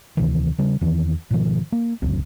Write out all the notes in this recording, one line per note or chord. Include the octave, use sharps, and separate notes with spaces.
D2 C3 D#3 E3
C#3 G3
E2 D#3 E3 C4
G#2 B2 D#3 F3
A#3
D1 C#2 F#2 C4